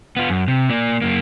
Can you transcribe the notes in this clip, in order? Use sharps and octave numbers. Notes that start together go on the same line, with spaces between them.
B3 F4
F#2
C3
A#3 D5
F#2 A#3